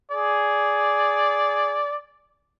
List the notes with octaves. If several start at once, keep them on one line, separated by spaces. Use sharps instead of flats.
G#4 D5